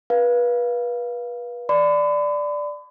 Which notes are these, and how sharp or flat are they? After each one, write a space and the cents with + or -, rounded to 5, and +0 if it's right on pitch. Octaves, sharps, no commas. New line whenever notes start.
B4 -30 F5 +0
D5 +0 B5 +40